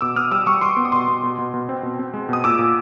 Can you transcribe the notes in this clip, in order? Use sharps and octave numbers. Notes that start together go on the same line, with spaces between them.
B2 D6 E6
B2 D#6 F6
G3 D6 E6
G3 C#6 D#6
G3 C6 D6
B3
D#6
B2 C6 D6
B2
B2
B2
B2
C4
B2
C4
G#3
B2 D#6
A#2 D6 E6
A#2